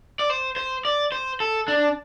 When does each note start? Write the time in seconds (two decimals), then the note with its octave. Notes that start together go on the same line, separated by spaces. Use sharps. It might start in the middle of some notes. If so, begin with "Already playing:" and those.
0.19 D5
0.30 C5
0.56 C5
0.85 D5
1.12 C5
1.40 A4
1.68 D4